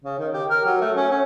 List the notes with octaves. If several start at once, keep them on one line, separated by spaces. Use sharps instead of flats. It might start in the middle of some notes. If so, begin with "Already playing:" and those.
C#3
D#3
G4
A#4
F#3
A3
C#4
C#4